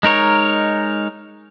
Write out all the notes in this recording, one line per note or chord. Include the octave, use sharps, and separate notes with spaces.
G#3 D#4 A#4 C#5